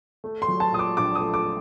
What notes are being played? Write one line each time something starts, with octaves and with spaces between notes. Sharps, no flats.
A3
C6
F#3
A5
A#2 D#6
D6
A#1 D6
D#6
A3
D6